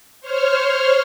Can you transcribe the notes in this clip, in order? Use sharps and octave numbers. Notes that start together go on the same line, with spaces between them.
C5 C#5 F6